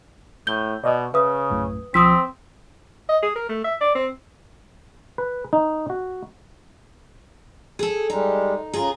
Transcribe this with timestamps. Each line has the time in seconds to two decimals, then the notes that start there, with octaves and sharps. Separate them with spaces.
0.47 A2 G6 G7
0.84 B2 D5 D#5
1.14 C#3 B4 E5 D#6
1.50 A#1 F#2 A2
1.94 B1 F3 C4 D#6 E6 B6
3.09 D#5
3.22 G#4
3.36 A#4
3.49 A3
3.64 E5
3.81 D5
3.95 C4
5.18 B4
5.53 D#4
5.90 F#4
7.79 G#4 A4
8.10 G3 G#3 D#4
8.74 C#3 F4 G#4 A#5